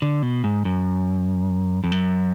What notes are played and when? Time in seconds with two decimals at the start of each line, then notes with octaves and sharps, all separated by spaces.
0.02 D3
0.22 B2
0.44 G#2
0.65 F#2
1.84 F2
1.92 F#2